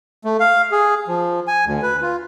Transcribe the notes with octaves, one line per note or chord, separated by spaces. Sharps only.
A3
F5
G#4
F3
G#5
D2
B4
F4